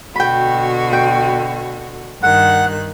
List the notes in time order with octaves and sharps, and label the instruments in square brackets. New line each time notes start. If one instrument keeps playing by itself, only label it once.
[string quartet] B2 D3 F#4 [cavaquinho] G5 B5
[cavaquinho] G5
[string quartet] G2 D#3 F#6 [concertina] F#5